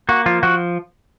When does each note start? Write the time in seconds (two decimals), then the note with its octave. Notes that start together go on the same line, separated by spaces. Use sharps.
0.09 A#3 F#4
0.26 F3 F4
0.43 F3 F#4